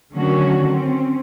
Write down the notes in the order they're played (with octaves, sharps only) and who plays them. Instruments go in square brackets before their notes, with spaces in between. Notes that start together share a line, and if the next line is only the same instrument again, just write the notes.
[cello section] D3 D#3 F#3 A3 C#4 F#4
C4 C#4